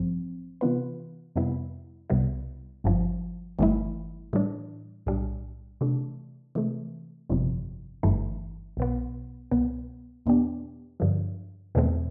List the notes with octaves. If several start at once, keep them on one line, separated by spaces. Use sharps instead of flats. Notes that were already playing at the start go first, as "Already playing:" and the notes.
Already playing: A1 G2 F3 C4
C3 E3 B3 F4 B4
F2 C3 G3 B3 E4
C2 C3 G3 B3 E4
G1 G2 F3
G1 G2 E3 A3 E4
A2 E3 G3 D4
B1 A2 G3 D4
C3 E3 A3 D4
C3 E3 A3
G1 F2 C3
G1 G2 E3 A3
B1 B2 B3
C2 B2 B3
E2 B2 B3 D4 G4
G2 D3 F3
E2 B2 A3 C4